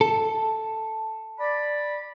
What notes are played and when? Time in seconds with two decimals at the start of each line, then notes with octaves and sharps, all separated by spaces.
0.01 A4
1.40 D5 B5